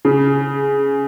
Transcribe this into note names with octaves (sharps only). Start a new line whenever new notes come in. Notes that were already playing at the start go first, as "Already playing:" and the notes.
C#3